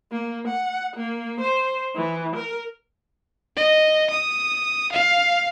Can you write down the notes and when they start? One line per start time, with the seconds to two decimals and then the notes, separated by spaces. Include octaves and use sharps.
0.12 A#3
0.48 F#5
0.96 A#3
1.40 C5
1.96 E3
2.36 A#4
3.56 D#5
4.10 D#6
4.92 F5